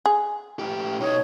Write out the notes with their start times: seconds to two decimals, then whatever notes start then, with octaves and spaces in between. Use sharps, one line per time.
0.06 G#4
0.59 A2 G4
1.00 B2 D#4 C#5